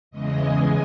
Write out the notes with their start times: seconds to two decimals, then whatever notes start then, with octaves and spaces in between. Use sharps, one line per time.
0.11 E2 C#3 E3 G#3 D#5
0.41 G#5